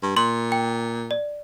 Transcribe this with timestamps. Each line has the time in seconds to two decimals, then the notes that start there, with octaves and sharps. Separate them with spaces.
0.03 G2
0.16 A#2 C6
0.52 G5
1.11 D5